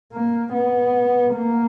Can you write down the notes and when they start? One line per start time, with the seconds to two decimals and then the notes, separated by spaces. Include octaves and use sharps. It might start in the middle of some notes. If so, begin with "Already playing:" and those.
0.13 A#3
0.53 B3
1.34 A#3